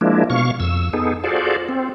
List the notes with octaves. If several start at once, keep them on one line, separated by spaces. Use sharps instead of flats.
F3 G#3 A#3 D4 E4
B2 F5 C#6
F2 E6
B3 D#4 G#4 A4
F4 F#4 G#4 A4 C5 D5
C4